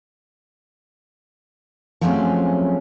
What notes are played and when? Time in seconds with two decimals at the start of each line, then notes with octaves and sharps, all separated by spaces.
2.01 F3 F#3 G#3 A3 C4 C#4